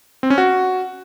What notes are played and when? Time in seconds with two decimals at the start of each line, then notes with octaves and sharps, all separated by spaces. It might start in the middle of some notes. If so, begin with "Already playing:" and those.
0.23 C4
0.30 C#4
0.38 F#4